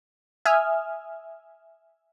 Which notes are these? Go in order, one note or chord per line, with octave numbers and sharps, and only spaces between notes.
E5 G#5 D#6 F6